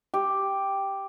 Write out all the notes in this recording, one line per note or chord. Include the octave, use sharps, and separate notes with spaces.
G4